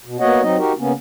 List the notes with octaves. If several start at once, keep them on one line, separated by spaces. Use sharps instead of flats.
B2
A#3 B3 F#4 C#5 D#5 F#5
F#3 C4 D#4 D#5
D#4 F#4 G4 A#4
C#3 A#3 B3 C#4